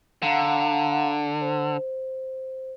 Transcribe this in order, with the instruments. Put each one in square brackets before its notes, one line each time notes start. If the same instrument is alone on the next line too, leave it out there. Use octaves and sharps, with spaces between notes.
[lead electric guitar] D3 [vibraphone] F5 F#5 A#5
[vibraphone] C5